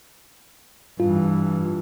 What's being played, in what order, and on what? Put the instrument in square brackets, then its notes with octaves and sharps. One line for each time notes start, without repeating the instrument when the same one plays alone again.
[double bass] G2 E3 [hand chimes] F4